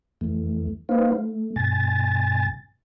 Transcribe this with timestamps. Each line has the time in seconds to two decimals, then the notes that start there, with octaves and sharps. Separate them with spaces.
0.21 F2 E3 A3
0.89 A#3 D#4 B4 C5 F5
1.12 A3
1.56 G2 B2 G#5 A6